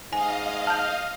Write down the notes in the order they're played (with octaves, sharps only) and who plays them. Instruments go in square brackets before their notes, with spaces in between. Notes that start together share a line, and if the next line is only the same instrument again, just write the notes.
[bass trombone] G#2 [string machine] D#5 F5 [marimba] G#5
[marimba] A5 G6 [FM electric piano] F6